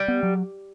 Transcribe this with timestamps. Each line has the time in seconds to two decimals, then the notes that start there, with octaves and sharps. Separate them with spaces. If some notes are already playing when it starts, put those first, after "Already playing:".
Already playing: G3
0.08 B3
0.23 F#3